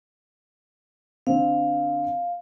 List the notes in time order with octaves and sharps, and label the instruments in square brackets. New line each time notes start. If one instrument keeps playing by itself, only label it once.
[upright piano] D3 C4 [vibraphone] F5